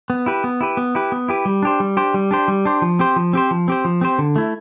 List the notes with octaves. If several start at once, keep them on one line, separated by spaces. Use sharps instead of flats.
B3
E4 G4 B4
B3
E4 G4 B4
B3
E4 G4 B4
B3
E4 G4 B4
G3
D4 G4 C5
G3
D4 G4 C5
G3
D4 G4 C5
G3
D4 G4 C5
F3
C4 G4 C5
F3
C4 G4 C5
F3
C4 G4 C5
F3
C4 G4 C5
D3
A3 E4